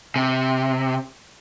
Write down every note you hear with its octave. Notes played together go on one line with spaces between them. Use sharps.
C3